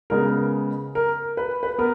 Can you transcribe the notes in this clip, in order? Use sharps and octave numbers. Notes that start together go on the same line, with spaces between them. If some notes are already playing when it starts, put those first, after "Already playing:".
C#3 G#3 B3 A#4
A#4
B4
B4
B3 A#4